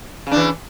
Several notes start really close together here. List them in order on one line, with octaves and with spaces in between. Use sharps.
C#3 D4 E3